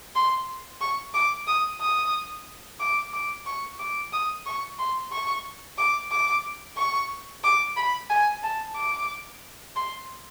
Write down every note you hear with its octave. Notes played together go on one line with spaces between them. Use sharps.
C6
C#6
D6
D#6
D#6
D6
D6
C#6
D6
D#6
C#6
C6
C#6
D6
D6
C#6
D6
B5
G#5
A5
D6
C6